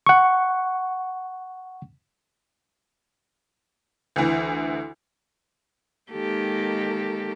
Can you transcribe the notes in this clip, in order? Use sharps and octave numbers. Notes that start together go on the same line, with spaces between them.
F#5 C#6
D2 E3
D#3 G#3 A#3 G4 A4